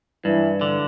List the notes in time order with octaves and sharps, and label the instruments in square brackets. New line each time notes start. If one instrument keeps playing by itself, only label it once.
[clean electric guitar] G2 [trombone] E3
[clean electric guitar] D3